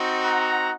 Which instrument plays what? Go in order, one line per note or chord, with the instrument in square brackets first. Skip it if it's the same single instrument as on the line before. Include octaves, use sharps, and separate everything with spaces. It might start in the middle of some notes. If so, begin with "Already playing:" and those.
Already playing: [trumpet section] C4 D#4 F#4
F#5 A#5